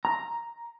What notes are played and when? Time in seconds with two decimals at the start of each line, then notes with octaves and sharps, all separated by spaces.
0.05 A#5